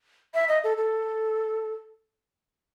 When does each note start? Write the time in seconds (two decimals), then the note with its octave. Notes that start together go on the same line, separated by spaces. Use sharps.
0.34 E5
0.48 D#5
0.64 A4
0.77 A4